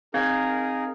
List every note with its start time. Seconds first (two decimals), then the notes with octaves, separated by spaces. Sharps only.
0.14 C4 D#4 G#4 A#4 F5 G#6